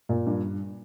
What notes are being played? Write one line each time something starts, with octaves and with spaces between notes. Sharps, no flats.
A#2
G2